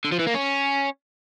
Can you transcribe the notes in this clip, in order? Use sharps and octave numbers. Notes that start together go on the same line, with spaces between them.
D3
F3
E3
A#3
C#4